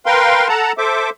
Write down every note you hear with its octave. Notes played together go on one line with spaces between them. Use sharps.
A#4 B4 F5 G5 C6
A4 F#5 A5 A#5
A4 C5 E5 D6